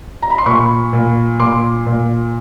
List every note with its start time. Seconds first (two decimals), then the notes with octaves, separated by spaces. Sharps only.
0.22 A#5
0.30 B5
0.38 C6
0.46 A#2 B5 C#6
0.93 A#2
1.40 A#2 C6 D6
1.87 A#2